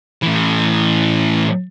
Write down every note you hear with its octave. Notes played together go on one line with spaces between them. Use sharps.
A2 E3